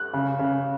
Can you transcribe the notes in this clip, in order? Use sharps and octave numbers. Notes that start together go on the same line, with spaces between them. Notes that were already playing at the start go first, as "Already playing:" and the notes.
Already playing: F#6
C#3
C#3